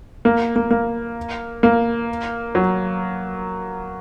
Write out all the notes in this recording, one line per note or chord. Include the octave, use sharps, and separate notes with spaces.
A#3
A#3
A#3
A#3
F#3